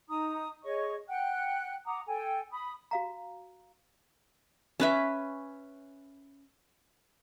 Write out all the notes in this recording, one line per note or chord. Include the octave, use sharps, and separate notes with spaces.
D#4 A#5 D#6
G#4 C#5 D#5 C#6
F#5 G5 F#6
F#5 A#5 D6 D#6
A4 G5 G#5
B5 D#6
F#4 F5 A#5
C#4 B4 E5